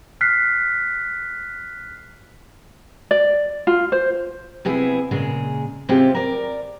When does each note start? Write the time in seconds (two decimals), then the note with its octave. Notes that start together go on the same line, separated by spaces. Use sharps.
0.21 F6 F#6 B6 C7
3.11 D5
3.67 F4
3.92 C5
4.65 C3 B3 E4 G#4
5.11 A#2 C#3 G#3 G#4
5.89 C3 G#3 C4 C#4 F4 G4
6.15 A#4 D5